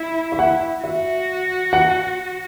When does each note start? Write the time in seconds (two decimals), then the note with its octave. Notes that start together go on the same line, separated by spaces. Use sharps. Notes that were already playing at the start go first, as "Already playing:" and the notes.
Already playing: E4
0.32 E5
0.39 F#5
0.84 F#4 E5
1.73 F#5